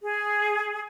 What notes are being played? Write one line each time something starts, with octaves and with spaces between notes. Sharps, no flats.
G#4